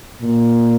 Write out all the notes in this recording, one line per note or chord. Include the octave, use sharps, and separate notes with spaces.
A#2